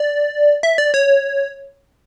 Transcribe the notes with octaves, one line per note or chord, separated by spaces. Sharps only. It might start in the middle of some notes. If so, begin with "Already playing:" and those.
Already playing: D5
E5
D5
C#5